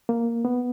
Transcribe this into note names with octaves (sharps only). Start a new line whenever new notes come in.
A#3
B3